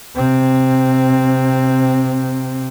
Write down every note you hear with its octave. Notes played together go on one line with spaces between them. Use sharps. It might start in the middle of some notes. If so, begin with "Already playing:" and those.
C3 C4